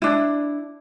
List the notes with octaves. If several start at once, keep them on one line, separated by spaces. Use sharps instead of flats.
D4 E4